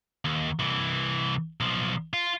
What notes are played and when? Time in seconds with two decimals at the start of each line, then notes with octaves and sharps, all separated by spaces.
0.25 D#2
0.59 C2 E3
1.60 B1 F3
2.13 F4